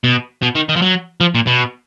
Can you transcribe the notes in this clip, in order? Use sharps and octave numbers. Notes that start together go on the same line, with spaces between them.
B2
B2
D#3
D#3
F3
F#3
F3
A#2
B2